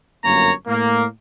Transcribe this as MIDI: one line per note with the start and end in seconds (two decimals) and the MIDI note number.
0.24 0.51 31
0.24 0.51 42
0.24 0.51 58
0.24 0.51 73
0.24 0.51 82
0.67 1.05 45
0.67 1.05 58